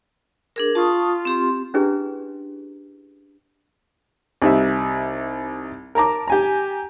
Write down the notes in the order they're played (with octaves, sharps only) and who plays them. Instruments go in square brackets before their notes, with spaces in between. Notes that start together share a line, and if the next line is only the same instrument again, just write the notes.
[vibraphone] D4 G#4 A#4
[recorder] F4 [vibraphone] A5 C#6 D#6
[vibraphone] C4 G4 C6
[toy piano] C#4 D4 E4 G4 G#4 B4
[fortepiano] C2 D#4 G4 E5
A#4 A5 A#5 D6
G4 G#5 A#5